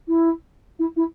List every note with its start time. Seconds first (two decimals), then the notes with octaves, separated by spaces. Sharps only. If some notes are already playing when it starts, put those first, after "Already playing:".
0.08 E4
0.79 E4
0.96 E4